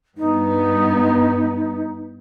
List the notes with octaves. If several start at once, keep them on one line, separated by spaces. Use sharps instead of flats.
G2 B3 D#4